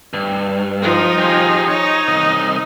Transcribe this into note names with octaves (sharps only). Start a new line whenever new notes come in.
G2
F3 D#4
G4 G#4
D#4 C#5
C2 D#5